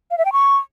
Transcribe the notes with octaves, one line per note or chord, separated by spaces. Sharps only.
F5
E5
G5
C#6